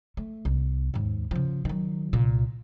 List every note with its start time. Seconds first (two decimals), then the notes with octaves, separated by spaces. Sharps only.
0.17 A3
0.45 C2
0.94 D#2 G#2
1.31 C#3 F3
1.65 D#3 F#3
2.13 C2 A#2